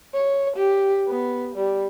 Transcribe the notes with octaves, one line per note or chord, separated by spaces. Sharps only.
C#5
G4
B3
G3